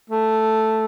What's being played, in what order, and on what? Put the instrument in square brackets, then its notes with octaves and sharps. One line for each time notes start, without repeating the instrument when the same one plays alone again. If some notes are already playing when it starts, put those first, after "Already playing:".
[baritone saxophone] A3